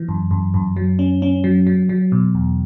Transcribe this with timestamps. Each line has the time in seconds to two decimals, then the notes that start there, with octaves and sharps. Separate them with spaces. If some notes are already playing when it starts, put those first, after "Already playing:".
Already playing: E3
0.08 F#2
0.31 F#2
0.54 F#2
0.76 F#3
0.99 C#4
1.22 C#4
1.44 F#3
1.67 F#3
1.89 F#3
2.12 B2
2.35 E2